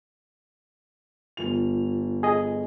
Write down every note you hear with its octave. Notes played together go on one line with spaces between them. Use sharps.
G1 F4 F7
G#4 D#5